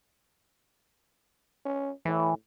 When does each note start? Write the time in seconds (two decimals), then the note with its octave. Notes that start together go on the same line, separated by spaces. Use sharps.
1.65 C#4
2.05 A2 E3